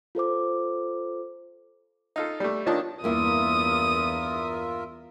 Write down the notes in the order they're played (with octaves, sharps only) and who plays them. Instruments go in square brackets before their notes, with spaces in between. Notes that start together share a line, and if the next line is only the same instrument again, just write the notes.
[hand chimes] F4 A4 C5 D6
[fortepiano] D#4 F4 A4
[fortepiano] G3 A3 [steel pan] D5
[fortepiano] D#3 D4 A5 [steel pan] F4 C#5 D#5
[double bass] E2 [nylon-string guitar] G2 A#3 E4 [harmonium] F4 A#4 E5 [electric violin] D#6